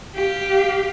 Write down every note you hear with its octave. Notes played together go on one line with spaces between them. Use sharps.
G4 F5